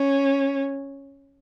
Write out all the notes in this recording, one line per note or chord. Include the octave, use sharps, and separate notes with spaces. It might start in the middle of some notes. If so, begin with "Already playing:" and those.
Already playing: C#4